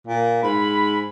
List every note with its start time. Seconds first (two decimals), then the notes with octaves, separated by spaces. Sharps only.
0.07 A#2
0.43 G#2 B5